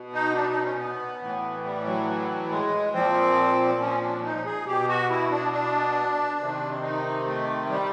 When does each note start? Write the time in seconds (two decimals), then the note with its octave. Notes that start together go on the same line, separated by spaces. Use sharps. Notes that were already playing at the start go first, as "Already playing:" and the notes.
Already playing: B2
0.13 D#4
0.34 D4
0.50 D#4
0.64 C#4
0.78 B3
1.22 A2 E3
1.64 G3
1.86 F#3
2.07 F#3
2.50 G#3
2.93 A#2 F3 C4
3.81 C#4
4.01 D4
4.24 D#4
4.45 G#4
4.66 B2 G4
4.88 F#4
5.10 E4
5.31 D4
5.52 D4
6.39 C3 D#3
6.82 D#4
7.25 A3
7.69 G3